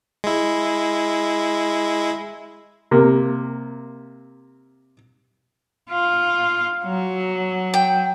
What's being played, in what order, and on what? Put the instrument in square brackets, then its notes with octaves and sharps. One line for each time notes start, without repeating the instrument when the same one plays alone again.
[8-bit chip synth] G#3 E4
[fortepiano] C3 A#3
[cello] F4
F#3
[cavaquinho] G5